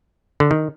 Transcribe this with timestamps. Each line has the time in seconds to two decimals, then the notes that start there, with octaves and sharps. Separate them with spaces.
0.40 D3
0.51 D#3